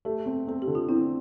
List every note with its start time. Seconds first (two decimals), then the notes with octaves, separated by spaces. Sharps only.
0.05 A3 G4
0.26 C4
0.47 C4 A4
0.62 G4
0.67 D3
0.75 F4
0.89 C4 E4